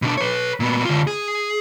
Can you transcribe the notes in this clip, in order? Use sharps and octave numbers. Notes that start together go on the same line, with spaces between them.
B2 D4
B4 C#5
A#2 B3
D3 F4
G#4